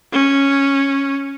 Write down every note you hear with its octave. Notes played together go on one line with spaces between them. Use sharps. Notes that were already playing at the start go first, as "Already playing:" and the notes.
C#4